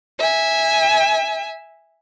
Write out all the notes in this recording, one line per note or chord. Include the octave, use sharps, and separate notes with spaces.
E5 G#5